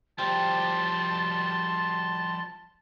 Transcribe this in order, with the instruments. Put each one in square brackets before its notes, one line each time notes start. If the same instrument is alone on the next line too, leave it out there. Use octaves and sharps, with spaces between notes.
[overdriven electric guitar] F3 G3 [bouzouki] G4 C5 [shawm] A5 [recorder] C6